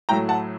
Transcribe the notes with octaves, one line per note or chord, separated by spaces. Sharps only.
A2 F#3 A3 G5 A#5
F#5 A5